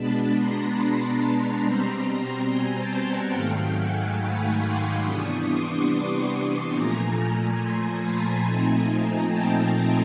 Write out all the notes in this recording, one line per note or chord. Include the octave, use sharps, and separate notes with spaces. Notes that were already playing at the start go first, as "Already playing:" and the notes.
Already playing: B2 G#3 B3 D4 A5 B5
A#5 C6
B2 G3 C4
G#5 A#5
G5 A5
F#5 G#5
G#2 D#3 F#3 A3 F5 G5
F#5 G#5
B5 C#6
C6 D6
C3 E3 G3 B3 D4 C#6 D#6
C6 D6
A#2 F3 A3 G#5 A#5
A#5 C6
A5 B5
A#2 F3 A3 C4 D#4 G#5 A#5
G#5 A#5
G5 A5
G5 A5